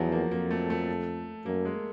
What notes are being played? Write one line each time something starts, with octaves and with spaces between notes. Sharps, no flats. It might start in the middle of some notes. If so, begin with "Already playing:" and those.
Already playing: E2 F3 F#3
A#3
F2 A#3
A3
A3
F#2 A#3
G#3